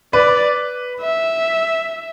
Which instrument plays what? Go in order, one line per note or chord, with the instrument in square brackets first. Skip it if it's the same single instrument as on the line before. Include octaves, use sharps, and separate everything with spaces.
[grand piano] B4 [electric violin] D5
[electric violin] E5